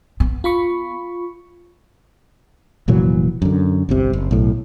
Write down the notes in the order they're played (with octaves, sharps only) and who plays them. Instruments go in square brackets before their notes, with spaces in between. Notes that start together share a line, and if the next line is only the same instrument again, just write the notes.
[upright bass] B3
[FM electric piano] F4 B5 C#6
[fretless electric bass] F1 A#2 E3 F#3
F#2 D3
G1 C2 C3
F#1
B1 A2